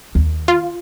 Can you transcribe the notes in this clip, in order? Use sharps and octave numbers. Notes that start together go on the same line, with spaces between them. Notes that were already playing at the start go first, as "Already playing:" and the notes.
D#2
F4